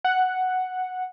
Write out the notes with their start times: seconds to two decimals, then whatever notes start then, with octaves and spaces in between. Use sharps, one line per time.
0.04 F#5